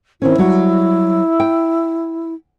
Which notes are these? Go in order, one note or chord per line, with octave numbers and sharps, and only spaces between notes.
D#3 C4 C#4 E4
F#3 G3 F#4
G5